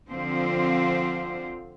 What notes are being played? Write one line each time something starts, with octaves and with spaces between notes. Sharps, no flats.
D3 F3 C4 F4 C5